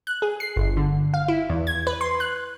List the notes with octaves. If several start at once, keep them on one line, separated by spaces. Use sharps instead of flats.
F#6
G#4
C7
G1
D3
F5
E4
E2
G#6
B4
C6
F#6